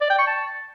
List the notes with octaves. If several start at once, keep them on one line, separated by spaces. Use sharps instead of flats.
D5
G5
C#6
A5